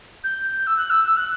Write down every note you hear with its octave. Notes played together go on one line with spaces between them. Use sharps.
G6
E6
F#6
E6
E6
F#6